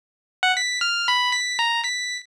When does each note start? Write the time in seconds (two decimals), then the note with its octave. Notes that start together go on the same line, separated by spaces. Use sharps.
0.43 F#5
0.57 B6
0.81 F6
1.08 B5
1.32 B6
1.59 A#5
1.84 B6